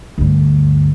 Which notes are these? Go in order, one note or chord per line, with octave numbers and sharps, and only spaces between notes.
D2 G2